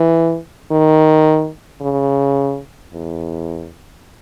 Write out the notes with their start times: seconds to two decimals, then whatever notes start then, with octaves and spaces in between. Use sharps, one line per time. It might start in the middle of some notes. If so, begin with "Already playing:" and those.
Already playing: E3
0.71 D#3
1.82 C#3
2.94 E2